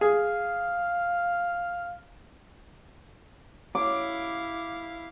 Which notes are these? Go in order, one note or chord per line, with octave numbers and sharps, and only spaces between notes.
G#4 F5
E4 F5 D6